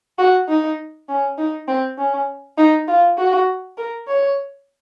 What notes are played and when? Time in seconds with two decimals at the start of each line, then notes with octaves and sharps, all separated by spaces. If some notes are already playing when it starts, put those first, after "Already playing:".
0.18 F#4
0.49 D#4
1.09 C#4
1.38 D#4
1.68 C4
1.98 C#4
2.57 D#4
2.88 F4
3.18 F#4
3.78 A#4
4.08 C#5